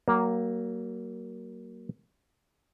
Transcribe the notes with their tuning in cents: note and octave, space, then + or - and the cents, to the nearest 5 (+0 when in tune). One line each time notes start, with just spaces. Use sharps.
F#3 +30 A#3 +0